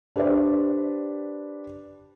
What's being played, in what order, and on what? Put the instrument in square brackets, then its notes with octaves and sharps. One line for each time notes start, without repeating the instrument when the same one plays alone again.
[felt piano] D4 G4 B4 C5 D5